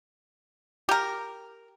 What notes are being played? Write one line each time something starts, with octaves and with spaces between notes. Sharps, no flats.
G4 A#4